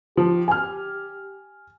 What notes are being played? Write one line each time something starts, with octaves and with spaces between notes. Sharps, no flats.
F3 G4
G#5 F6